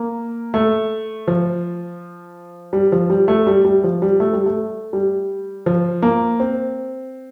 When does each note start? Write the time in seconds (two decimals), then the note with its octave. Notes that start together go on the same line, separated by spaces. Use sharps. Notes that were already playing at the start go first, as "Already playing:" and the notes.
Already playing: A#3
0.54 A3
1.28 F3
2.73 G3
2.92 F3
3.10 G3
3.28 A3
3.47 G3
3.65 G3
3.84 F3
4.02 G3
4.20 A3
4.33 G3
4.46 A3
4.93 G3
5.66 F3
6.02 A#3
6.40 C4